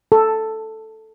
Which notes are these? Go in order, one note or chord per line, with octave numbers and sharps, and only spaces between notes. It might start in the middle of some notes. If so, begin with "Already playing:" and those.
A4